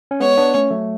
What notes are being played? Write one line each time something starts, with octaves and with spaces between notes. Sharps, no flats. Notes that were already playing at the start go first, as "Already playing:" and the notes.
C#4
G#3 B3 C#5
B3 D4
A3 C#4
F#3 A3